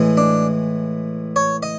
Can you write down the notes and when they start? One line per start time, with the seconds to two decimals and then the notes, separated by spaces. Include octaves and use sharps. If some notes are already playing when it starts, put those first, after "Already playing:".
Already playing: A2 E3 G#3
0.17 D4
1.36 C#5
1.63 D#5